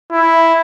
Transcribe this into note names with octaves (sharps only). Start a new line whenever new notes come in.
E4